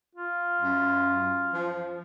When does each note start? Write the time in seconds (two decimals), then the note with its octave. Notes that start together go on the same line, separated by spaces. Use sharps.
0.15 F4
0.62 F#2
1.54 F3